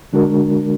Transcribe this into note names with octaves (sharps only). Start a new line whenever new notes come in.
D3 G#3 D4 F#4 A#4